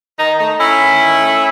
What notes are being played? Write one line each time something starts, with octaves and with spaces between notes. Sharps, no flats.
D#3 D#4
A3 D#4
A3 C#4 E4
D#3
D#3
A3